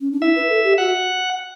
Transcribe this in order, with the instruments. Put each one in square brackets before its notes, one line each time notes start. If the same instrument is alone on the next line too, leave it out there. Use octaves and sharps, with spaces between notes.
[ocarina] C#4
D4
[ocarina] E4 [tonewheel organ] E5
[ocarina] B4
A4
G4
[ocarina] F#4 [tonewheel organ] F#5